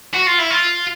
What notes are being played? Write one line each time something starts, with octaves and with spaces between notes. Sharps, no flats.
F#4
F4
E4
F4